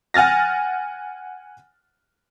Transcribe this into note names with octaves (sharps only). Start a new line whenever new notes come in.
F#5 G#5 F6 A6 A#6